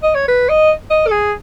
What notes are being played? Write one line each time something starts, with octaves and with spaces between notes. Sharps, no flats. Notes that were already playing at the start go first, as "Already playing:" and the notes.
D#5
C#5
B4
D#5
D#5
A4
G#4